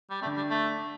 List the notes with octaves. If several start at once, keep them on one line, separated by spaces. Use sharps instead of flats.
G3
D3 A3
G3
A3